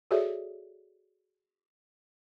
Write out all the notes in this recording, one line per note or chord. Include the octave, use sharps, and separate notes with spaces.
F#4 G#4 A4 C#5 D5 E5